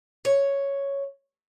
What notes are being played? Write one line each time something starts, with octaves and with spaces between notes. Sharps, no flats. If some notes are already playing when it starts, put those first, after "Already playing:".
C#5